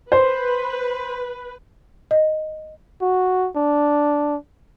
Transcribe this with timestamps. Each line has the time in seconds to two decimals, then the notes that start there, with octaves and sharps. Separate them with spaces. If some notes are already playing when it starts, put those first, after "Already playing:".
0.12 B4 C5
2.11 D#5
3.01 F#4
3.56 D4